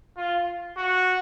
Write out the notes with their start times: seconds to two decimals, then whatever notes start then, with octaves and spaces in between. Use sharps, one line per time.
0.17 F4
0.77 F#4